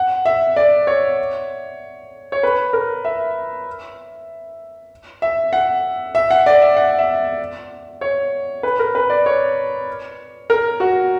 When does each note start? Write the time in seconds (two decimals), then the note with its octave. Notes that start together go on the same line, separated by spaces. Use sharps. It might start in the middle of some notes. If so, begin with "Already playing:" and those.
Already playing: F#5
0.25 E5
0.56 D5
0.87 C#5
2.32 C#5
2.43 B4
2.73 A#4
3.05 E5
5.22 E5
5.53 F#5
6.15 E5
6.31 F#5
6.46 D5
6.62 E5
6.77 F#5
6.98 E5
8.01 C#5
8.63 B4
8.79 A#4
8.95 B4
9.10 D5
9.26 C#5
10.50 A#4
10.80 F#4